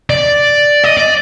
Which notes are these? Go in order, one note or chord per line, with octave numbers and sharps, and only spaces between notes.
D5
D#5
D5